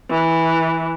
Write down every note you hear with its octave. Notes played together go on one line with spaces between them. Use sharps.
E3